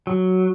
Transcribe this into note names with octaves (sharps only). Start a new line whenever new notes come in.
F#3